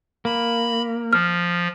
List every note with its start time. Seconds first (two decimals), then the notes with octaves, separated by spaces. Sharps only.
0.25 A#3 B5
1.13 F3 F6